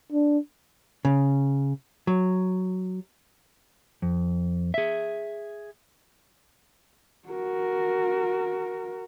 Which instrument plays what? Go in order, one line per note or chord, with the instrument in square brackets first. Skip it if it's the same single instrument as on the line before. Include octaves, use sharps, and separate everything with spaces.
[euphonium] D4
[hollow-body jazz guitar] C#3
F#3
[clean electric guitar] F2
G#4 E5
[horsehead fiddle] F#4 A#4